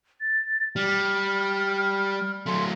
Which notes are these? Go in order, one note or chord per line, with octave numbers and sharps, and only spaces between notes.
A6
G3 F6
F#3 A3 C6